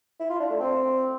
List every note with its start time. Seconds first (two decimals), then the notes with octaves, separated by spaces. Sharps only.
0.20 E4
0.30 F4
0.40 D4
0.50 A3
0.60 C4